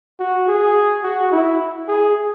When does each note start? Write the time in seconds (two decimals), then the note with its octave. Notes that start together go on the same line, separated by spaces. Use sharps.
0.19 F#4
0.48 G#4
1.03 F#4
1.32 E4
1.88 G#4